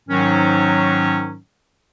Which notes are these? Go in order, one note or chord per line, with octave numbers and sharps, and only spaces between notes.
G#2 D#3 F#3 C#4